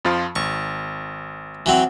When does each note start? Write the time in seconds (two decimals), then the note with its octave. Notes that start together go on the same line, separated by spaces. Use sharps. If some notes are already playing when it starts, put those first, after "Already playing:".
0.05 F2 F3 F4
0.36 G#1 C#6
1.66 E3 F#3 C4